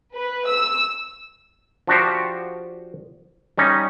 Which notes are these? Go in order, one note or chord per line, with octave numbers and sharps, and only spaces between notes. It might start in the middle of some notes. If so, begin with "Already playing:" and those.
B4
E6
F3 D4 F#4 G4 C5
G3 C#4 D#4